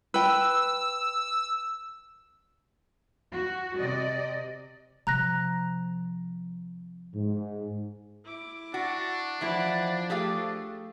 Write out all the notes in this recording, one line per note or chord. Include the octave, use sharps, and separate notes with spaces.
B4 G5 E6
F#4
C3 D5 D#5
C3 F3 A#5 F#6 A#6
G#2
E4 D6
D4 F#4
E3 F3 E4 D5 F#5
A3 G4 G#4 F5